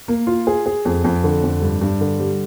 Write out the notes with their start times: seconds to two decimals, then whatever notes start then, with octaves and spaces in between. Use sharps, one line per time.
0.08 A#3
0.27 F4
0.47 G#4
0.66 G#4
0.85 F2
1.04 F2
1.24 D3
1.43 F2
1.62 G2
1.81 G2
2.01 D3
2.20 G3